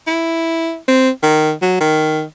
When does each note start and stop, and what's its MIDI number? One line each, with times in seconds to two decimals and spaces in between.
0.07 0.76 64
0.88 1.10 60
1.23 1.52 51
1.62 1.76 54
1.81 2.22 51